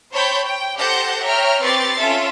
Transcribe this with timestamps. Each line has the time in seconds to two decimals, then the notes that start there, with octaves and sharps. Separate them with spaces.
0.13 C5 C#5 G5 A5 B5 G6
0.45 G5
0.78 G4 A4 C5 F#5 G6 A#6
1.23 C#5 E5 G5 A#5 F6
1.62 C4 G4 B4 C#6 A6 C7
1.98 C#4 F4 A4 E5